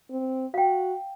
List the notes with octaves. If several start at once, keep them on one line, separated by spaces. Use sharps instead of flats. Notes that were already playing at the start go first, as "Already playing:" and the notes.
C4
F#4 F5 G5